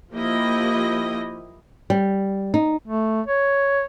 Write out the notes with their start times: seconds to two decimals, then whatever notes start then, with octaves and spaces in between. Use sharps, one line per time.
0.13 F3 A#3 E4 G4 D#5
1.90 G3
2.54 D#4
2.87 A3
3.27 C#5